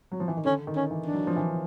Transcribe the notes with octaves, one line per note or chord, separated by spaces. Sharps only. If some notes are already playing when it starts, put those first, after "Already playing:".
F#3
F3
E3
D#3
D3 C#4
D#3
C#4
E3
D4
F#3
F3
E3